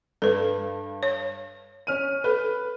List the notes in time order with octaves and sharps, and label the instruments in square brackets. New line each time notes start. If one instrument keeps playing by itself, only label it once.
[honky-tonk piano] G2 [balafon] A4 B4
[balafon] C#5
[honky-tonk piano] C#4 F6 D#7
[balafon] A4 [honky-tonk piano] B4